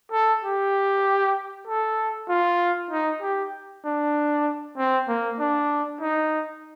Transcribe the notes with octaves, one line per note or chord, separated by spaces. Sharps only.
A4
G4
A4
F4
D#4
G4
D4
C4
A#3
D4
D#4